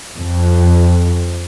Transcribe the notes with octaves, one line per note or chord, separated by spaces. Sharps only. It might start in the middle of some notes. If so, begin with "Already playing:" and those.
F2